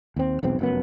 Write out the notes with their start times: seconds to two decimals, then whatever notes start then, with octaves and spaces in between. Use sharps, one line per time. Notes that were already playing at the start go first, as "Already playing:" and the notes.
0.16 D#2 C4
0.43 E1 B1 C4
0.59 F1 F#2 B3